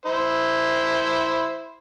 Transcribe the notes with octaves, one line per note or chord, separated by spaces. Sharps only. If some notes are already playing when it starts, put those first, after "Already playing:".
E4 C5